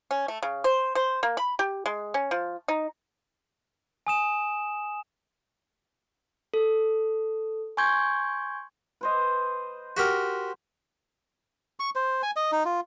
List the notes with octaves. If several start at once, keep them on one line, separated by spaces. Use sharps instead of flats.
C#4
A3
C#3
C5
C5
A#3
B5
G4
G#3
C#4
F3
D#4
G#5 D#6 E7
A4
G#5 C6 C#6 G6 G#6
B4 C5 D#5
F#4 G4 A#4
C#6
C5
G#5
D#5
D#4
F4